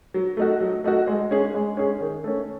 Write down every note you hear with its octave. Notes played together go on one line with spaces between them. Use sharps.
F#3
A3 D#4 F#4
F#3
A3 D#4 F#4
G#3
C#4 G#4
G#3
C#4 G#4
D#3
A3 C#4